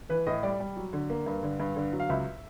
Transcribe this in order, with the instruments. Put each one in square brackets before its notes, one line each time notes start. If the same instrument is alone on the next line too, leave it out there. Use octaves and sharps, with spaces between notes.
[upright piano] E3 B4
A2 D#5
G3 D5
G3
F#3
D3
A#3
G2
D3
G2
D3
F#3
F5
C#2 E5